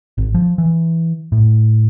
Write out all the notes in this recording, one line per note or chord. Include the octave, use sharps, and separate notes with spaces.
G#1
F3
E3
A2